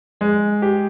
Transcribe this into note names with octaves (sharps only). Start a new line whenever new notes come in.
G#3
G4